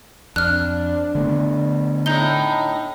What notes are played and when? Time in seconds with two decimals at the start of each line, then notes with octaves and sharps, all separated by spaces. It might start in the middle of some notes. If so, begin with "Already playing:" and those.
0.36 F2 D4 F6 F#6
1.15 D3 A3 B3
2.06 A2 D#4 A#5 G6 G7